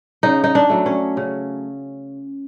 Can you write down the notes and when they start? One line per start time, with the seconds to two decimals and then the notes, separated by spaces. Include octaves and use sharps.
0.23 C#3 D#4
0.44 D#4
0.55 D4
0.70 F#3 A3
0.86 C#4
1.17 C#3